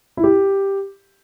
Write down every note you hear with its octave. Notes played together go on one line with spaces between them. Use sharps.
E4
G4